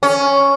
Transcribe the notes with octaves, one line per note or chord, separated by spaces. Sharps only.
C#4